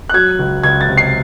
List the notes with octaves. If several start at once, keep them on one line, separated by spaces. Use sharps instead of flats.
F#6
F#3 G#6
C#2
C#2 G#6
A6
C3
C7